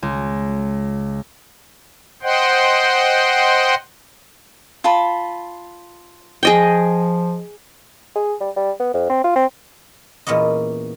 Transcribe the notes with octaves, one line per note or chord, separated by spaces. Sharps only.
C#2
C5 D#5 F#5 G5 C6
F4 A5 B5
F3 G#4 D#5 G5
G#4
G3
G3
B3
F2
C4
F4
C4
E2 A#2 B3 C#4 D#5